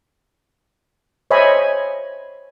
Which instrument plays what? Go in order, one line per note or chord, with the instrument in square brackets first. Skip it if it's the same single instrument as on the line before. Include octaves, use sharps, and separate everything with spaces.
[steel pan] C5 C#5 D#5 E5 G#5 B5